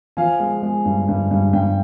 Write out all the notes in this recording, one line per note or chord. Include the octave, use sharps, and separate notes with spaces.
F3 F5 G#5
G#3
G#3
G2
G2
G2
G2 G5